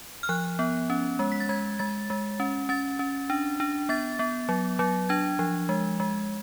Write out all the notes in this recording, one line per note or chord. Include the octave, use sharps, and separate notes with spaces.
F6
F3 F#6
B3
C#4
G#3
B6
A6
G#3 G#6
G#3 A6
G#3
C#4
C#4 A6
C#4
D4
D4
B3 A6
B3
F#3
F#3
D4 G#6
F3
G#3
G#3